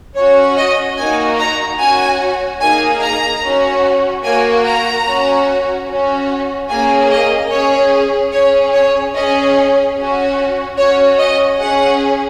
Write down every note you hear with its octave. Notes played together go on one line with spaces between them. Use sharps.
C#4 F#4 C#5
D#5
A#3 D#4 F#4 G#5
A#5
C#4 F#4 G#5
A#3 D#4 G#4 G#5
A#5
C#4 F#4
A#3 F#4 G#5
A#5
C#4 F#4
C#4 F#4
A#3 C#4 G#4 G#5
D#5
C#4 G#4 C#5
C#4 G#4 C#5
C#5
C#4 G#4 D#5
C#4 F#4
C#4 F#4 C#5
D#5
C#4 G#4 F#5